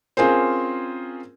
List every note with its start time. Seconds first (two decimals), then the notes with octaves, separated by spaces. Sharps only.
0.17 C4 C#4 F4 G#4 A#4 C5